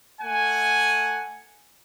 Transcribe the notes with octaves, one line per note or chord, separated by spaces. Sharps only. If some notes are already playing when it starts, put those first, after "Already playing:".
A3 F#5 G#5